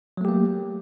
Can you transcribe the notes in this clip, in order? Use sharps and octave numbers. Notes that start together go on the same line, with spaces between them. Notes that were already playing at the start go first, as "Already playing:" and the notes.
F#3 A3 A#3 G4